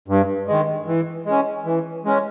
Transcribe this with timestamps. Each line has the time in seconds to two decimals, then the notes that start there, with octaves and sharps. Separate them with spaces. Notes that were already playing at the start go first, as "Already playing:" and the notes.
0.08 G2
0.48 D#3 G#3
0.87 E3
1.26 G#3 C#4
1.65 E3
2.05 G#3 C#4